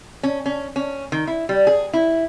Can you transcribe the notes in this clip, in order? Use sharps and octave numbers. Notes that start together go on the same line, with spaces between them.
C#4
C#4
C#4
D#3
E4
G3
G#4
E4